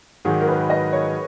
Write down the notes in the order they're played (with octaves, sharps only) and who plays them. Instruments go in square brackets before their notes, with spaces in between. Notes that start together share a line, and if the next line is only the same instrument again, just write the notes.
[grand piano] G#2 D#3 F#3 [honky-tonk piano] G#4
[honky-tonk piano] A#4
B4
D#5
C#5